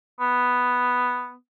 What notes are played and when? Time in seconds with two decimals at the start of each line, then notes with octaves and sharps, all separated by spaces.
0.20 B3